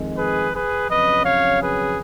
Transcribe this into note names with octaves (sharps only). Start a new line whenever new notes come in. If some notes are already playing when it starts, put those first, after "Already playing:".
Already playing: F2 D#3 G#3
G#4 B4
G#4 B4
F2 C#3 F#3 C#4 B4 D#5
C#5 F5
G#4 B4